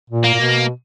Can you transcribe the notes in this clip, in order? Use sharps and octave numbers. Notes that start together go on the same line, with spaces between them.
A#2
A#3
A#2
B2